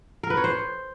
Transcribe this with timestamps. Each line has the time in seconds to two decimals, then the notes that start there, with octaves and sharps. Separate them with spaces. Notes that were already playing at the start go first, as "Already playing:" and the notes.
0.23 A#4
0.30 B4
0.37 C#5
0.44 C5